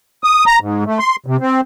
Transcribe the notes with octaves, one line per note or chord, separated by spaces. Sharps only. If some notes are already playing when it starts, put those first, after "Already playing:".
D#6
A#5
G#2
A3
C6
C3
C4